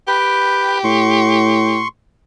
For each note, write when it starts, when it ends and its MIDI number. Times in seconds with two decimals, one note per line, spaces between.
0.08 1.83 67
0.08 0.78 71
0.08 0.78 79
0.84 1.83 45
0.84 1.88 84
0.84 1.88 85